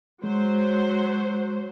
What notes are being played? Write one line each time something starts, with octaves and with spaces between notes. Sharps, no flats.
F#3 G#3 C5